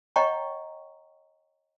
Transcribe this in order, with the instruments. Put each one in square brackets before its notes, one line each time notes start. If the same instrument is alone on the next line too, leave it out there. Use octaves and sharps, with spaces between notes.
[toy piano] C#5 D#5 F#5 G5 A#5 C#6